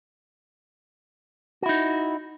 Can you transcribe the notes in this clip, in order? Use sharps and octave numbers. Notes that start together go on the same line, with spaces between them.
D#4 E4 F#4